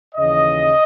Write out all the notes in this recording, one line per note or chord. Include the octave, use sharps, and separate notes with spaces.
D#2 C#3 E3 D#5